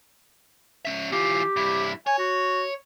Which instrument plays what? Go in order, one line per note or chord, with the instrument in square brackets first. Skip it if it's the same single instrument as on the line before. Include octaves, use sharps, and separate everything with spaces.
[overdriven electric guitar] C#4 E5
[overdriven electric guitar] E3 F4 [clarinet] G4
[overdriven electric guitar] G2 E4
[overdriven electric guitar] C#5 [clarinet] G#5
[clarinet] F#4